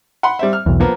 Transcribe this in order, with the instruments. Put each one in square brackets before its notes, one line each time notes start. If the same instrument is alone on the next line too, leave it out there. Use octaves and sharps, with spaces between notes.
[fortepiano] F#5 B5 C6
G3 C4 E5
F6
[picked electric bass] B1 E2
[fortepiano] F3 A#3 B3